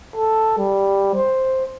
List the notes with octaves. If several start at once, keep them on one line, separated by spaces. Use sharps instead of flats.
A4
G3
C5